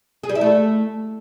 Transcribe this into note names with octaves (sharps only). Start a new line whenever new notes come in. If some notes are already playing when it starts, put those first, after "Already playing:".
G#4
G3
E4
A3